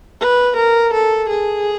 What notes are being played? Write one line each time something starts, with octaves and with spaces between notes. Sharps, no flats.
B4
A#4
A4
G#4